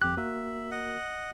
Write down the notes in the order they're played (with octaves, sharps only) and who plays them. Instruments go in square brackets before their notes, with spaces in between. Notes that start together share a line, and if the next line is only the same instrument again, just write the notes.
[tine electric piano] G1 F2 [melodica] G4 [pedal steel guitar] F#6
[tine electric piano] A#3 F#4 A#4 [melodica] E5
[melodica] D#5 F#5